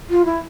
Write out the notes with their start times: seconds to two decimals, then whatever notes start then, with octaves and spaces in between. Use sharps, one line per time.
0.10 F4
0.25 E4